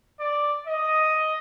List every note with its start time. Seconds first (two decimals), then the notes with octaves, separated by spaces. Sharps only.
0.20 D5
0.67 D#5